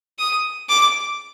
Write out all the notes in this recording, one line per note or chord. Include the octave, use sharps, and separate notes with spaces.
D#6
D6